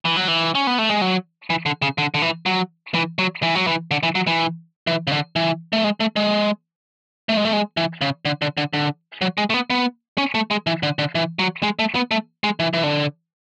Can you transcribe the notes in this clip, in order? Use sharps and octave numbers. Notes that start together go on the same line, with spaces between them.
E3
F#3
E3
C#4
B3
A3
G#3
F#3
E3
D3
C#3
D3
D3
E3
F#3
E3
F#3
E3
F#3
E3
D3
E3
F#3
E3
E3
C#3
D3
E3
A3
G#3
A3
G#3
A3
G#3
A3
G#3
E3
C#3
D3
D3
D3
D3
F#3
G#3
A3
B3
B3
C#4
A3
G#3
E3
D3
D3
E3
F#3
G#3
A3
B3
A3
G#3
E3
E3
D3